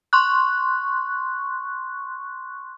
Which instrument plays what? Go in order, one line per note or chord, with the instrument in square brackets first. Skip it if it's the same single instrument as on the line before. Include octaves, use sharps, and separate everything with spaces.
[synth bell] C6 C#6 F#6